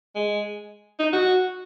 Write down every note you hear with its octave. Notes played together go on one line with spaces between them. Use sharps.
G#3
D#4
F#4